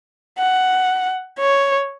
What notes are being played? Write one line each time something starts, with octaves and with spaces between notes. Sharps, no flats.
F#5
C#5